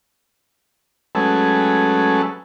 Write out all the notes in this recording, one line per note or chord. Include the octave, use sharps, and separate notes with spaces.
F#3 G#3 A3 C#4 A4 B4